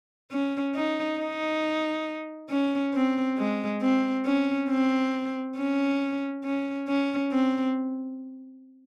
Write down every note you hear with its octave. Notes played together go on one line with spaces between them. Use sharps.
C#4
D#4
D#4
C#4
C4
G#3
C4
C#4
C4
C#4
C#4
C#4
C4